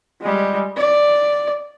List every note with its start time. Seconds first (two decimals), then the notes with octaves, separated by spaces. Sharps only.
0.21 G3 G#3
0.77 D5